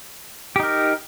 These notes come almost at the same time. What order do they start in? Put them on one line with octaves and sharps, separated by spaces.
G4 D#4 A#4